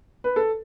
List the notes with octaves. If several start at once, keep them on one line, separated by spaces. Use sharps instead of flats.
B4
A4